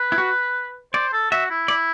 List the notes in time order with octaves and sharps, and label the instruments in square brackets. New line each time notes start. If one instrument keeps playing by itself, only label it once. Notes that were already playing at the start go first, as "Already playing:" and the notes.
Already playing: [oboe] B4
[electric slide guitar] E4
F#4
[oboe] C5 [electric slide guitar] D5
[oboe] A4
[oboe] F#4 [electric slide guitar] E5
[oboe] E4
[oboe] E4 [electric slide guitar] D5